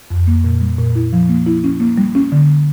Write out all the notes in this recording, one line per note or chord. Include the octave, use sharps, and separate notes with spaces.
F2
A#3
A#2
G3
A#2
E4
F3
A#3
E4
C#4
A#3
G3
C#4
D3